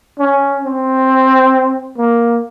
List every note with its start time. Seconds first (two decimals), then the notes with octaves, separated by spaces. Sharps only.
0.20 C#4
0.64 C4
1.98 A#3